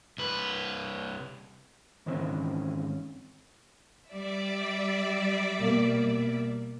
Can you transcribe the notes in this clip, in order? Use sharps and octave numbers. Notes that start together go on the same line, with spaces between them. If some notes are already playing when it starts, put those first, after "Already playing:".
C2 B4
G#2 D#3 E3 C4 C#4
G3 D5 E5
B2 A#3